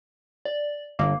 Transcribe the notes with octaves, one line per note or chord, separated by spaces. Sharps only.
D5
G1 A#3